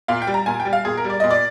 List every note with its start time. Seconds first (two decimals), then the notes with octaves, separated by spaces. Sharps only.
0.08 A#2 F5
0.22 G5
0.27 G3
0.34 A#5
0.46 A#2 G#5
0.60 G5
0.65 G3
0.73 F5
0.85 A#2 G#4
0.97 A#4
1.05 G3
1.10 D5
1.20 A#2 D#5
1.30 D5